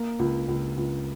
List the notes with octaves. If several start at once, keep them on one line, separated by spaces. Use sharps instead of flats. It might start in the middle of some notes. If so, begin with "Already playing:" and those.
Already playing: A#3
C#2
C#2
C#2